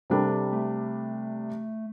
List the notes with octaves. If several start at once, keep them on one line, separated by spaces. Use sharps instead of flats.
C3 G3 D4 A4
A3